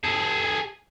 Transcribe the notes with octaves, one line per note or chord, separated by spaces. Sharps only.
G#4 A4